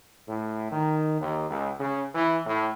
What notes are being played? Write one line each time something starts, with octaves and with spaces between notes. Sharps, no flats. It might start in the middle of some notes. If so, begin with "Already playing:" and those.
A2
D#3
D#2
C#2
C#3
E3
A2